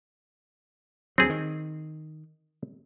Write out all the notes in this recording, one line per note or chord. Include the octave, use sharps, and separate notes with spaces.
D2 F#3 C4 G#4
D#3